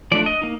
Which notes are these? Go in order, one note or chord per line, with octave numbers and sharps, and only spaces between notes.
F3 A3 D4 D5
D#5
A#3 D#4